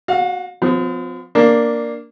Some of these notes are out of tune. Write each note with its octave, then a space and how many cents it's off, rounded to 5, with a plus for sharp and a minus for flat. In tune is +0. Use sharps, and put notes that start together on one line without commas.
F#4 +0 F5 +35
F3 +30 C4 -45
A#3 +0 D4 +0